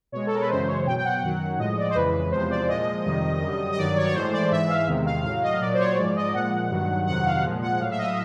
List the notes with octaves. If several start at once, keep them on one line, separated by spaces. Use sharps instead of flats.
B2 G#3 C#5
A4
A#4
B4
F#2 C#3 E3 G#3 C5
C#5
B2 F#3 G5
G5
F#5
F#2 D#3 F#3 F#5
A2 F3 G#3 D#5
D5
C5
F2 C#3 E3 G#3 B4
B4
E2 C3 F3 G#3 C5
D5
A#2 F3 G#3 D#5
F2 C3 D#3 G3
F#2 D3 G3
D#5
G2 D#3 F#3 D5
C#5
C#5
A2 E3 G#3 C5
D5
G#2 E3 G#3 E5
F5
E2 C3 D#3 G#3
F5
A2 F#3 F5
D#5
A#2 F#3 D5
C5
C#5
G#2 F3 G#3 D5
D#5
A#2 F3 G#3 F#5
G2 D#3 F#3
F2 C3 D#3 F#3 F#5
F5
A#2 F3 G#3
F#5
A2 F#3 F5
E5
D#5